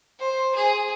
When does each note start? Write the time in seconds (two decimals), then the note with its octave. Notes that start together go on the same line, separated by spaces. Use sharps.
0.20 C5
0.55 G#4